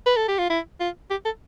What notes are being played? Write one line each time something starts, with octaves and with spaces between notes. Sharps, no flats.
B4
A4
G4
F4
E4
F4
G4
A4